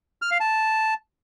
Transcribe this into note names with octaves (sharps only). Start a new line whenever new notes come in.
F6
F5
A5